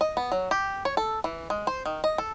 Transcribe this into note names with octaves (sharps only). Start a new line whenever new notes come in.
D#5
B3
F#3
G4
C#5
A4
E3
G#3
C5
D#3
D#5
A4